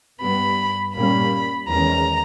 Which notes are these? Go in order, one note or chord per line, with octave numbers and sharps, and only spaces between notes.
G2 G3 B3 B5
A#2 G3 A#3 C#4 B5
E2 D#3 G#3 C#4 A#5